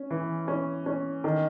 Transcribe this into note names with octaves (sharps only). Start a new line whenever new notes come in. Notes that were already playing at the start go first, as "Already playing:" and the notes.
Already playing: C#4
E3
C#4
C#4
D#3